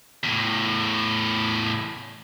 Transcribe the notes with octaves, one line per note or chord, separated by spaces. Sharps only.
E2 A2